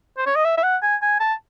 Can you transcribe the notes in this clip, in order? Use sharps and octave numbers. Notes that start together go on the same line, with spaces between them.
C5
C#5
D#5
E5
E5
F#5
G#5
G#5
A5